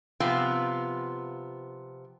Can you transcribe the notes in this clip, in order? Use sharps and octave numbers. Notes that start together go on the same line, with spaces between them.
C3 F3 B3 F4